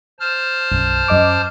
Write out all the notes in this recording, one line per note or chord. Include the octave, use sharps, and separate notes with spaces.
C5 A5 F6
B1 F#2
F#2 D#5 D6